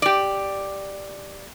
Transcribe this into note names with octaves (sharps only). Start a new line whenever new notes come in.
G4 D5